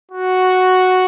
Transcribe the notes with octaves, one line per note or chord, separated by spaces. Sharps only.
F#4